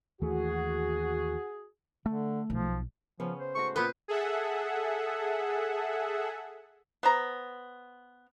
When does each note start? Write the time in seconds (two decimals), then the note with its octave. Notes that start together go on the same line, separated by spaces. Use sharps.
0.22 D#2 E3 A3 F#4 G#4
2.06 D3 A3
2.50 B1 F3
3.20 C#3 F3 B3 C#4
3.39 C5
3.55 G#2 A3 F#4 C#6
3.76 A#2 B3 B4 C5 G5
4.08 G#4 A4 E5 F#5
7.03 B3 C5 A#5